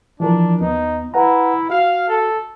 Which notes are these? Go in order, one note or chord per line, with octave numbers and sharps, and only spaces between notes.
E3 F3 D4 A#4
D#2 B3 D#4
E4 B4 F#5 A#5
F#4 F5
A4